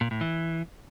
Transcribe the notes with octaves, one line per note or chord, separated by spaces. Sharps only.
A#2
A2
E3